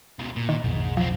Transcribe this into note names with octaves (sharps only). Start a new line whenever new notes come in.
C#2 B2
A#2
D#3
B1 F2 G#2 B2
F#2 F3 C4